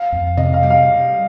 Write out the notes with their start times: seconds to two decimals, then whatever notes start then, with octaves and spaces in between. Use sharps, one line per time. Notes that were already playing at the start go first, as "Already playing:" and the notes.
Already playing: F5
0.12 F2
0.37 C3 D#5
0.54 F5
0.63 G3
0.70 F5